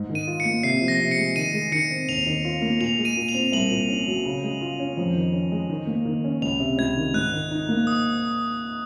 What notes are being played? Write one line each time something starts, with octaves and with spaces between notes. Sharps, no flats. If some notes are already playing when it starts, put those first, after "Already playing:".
Already playing: G#2
D#3
D#7
F4
C#7
A#3
C3 C7
F3
A#6
C3
C#7
G#3
D#3 D#7
G#3
D#3 C#7
C4
D#2 F7
D#3
F4
A#3
A#2 F7
G#3
D#7
A#2
F7
C4
C2 F#7
A#2
C#4
F#3
C#3
G#3
F4
C#4
F2
D#3
C#4
G#3
D#3
A#3
D#3
C#4
C#2 F7
C3
C#2 G#6
D#3
G#2 F#6
D#3
D#4
A#3
D#6